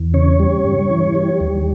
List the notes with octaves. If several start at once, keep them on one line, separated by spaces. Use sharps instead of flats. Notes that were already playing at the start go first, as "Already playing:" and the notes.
Already playing: E2
C#3 C#5
G3
G2
E3
G3
D#2